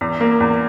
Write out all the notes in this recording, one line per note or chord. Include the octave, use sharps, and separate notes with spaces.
E2
A#3
E2